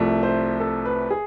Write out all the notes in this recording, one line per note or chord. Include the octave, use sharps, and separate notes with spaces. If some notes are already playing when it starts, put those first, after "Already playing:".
Already playing: C2 C3 F3 A3
C5
A4
B4
G#4